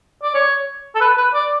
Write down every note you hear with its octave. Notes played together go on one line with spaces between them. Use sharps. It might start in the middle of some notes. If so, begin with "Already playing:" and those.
D5
C#5
A4
B4
B4
D5